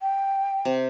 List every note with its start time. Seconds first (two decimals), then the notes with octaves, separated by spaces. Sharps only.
0.01 G5
0.65 C3